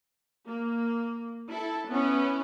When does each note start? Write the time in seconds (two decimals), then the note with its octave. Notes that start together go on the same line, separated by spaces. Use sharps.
0.48 A#3
1.51 E4 A4
1.89 B3 C#4 E4